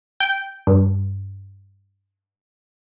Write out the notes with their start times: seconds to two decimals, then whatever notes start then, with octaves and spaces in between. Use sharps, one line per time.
0.20 G5
0.67 G2